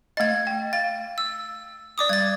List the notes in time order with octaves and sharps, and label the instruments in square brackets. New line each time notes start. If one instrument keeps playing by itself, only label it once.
[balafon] A3 D#5 [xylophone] G#6 A6
[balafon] G5
[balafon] F5 [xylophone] A6
[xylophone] E6
D5 D6 D#6
[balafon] G3 [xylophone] G#6 A6